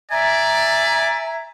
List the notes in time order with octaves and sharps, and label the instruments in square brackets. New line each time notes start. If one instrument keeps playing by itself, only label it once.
[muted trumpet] D5 [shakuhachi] E5 [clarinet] G#5 [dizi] A#5